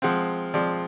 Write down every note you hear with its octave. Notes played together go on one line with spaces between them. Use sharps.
F3 G#3 C4 F#5
F3 G#3 C4 D5